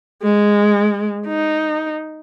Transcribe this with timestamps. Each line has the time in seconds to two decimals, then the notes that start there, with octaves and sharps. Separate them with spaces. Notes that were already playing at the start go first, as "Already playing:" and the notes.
0.23 G#3
1.27 D#4